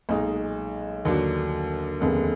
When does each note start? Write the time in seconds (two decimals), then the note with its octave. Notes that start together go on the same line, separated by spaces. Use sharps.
0.09 B1 A#2 G#3 D#4
1.05 D#2 D3 F#3 D4
2.00 F1 D#2 D3 G#3 B3